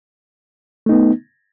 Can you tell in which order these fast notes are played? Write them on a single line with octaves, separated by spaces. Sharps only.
A3 D#4 B3